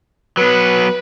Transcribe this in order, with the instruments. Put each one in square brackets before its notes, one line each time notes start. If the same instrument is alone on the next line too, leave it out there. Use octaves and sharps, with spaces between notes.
[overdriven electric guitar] F#3 B3 [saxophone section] B4